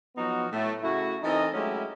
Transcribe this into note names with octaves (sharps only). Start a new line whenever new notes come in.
F3 F#3 B3 D#4 F#4
A2 A3
C#3 A3 E4 F#4
E3 C4 D#4 A4 A#4 D#5
F#3 G#3 A3 C#4 E4 G4